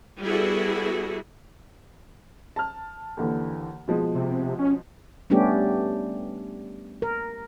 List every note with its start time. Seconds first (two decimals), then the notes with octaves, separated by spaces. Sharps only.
0.22 G3 B3 E4 F#4 G#4 A4
2.56 A5 F6
3.17 D#2 D3 E3
3.88 B2 F3 G#3
4.15 C3
4.59 C#4
5.30 G3 A3 B3 C#4 D4 G4
7.02 A#4